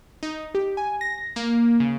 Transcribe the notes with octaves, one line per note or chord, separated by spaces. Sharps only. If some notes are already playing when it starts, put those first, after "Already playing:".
D#4
G4
G#5
A#6
A#3
C#3